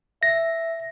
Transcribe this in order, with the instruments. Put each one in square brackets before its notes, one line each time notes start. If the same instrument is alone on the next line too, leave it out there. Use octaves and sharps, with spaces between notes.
[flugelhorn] E5 [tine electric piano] A#6